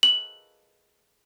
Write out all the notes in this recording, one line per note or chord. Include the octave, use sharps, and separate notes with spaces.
F#7